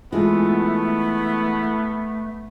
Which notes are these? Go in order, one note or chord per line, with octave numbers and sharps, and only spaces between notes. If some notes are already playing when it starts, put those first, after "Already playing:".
E3 G#3 A3 B3 F4